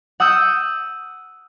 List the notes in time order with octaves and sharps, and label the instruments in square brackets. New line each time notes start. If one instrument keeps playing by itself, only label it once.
[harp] F#5 D#6 E6 G6